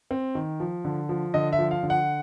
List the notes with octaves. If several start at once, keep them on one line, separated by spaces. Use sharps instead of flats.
C4
D#3
F3
D3
F3
D3 D#5
E5
F3
F5
D3
F#5